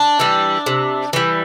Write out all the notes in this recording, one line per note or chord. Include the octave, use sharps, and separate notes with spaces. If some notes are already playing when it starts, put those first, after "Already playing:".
Already playing: D4
E3 G3
C3
E3 G3